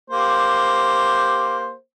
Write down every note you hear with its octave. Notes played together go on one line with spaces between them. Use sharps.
A#3 G4 C5